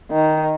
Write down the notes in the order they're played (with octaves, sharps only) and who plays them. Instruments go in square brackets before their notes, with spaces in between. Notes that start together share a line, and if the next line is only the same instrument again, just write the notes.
[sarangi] D#3